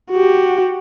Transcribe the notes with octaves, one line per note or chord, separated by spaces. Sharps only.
F#4 G4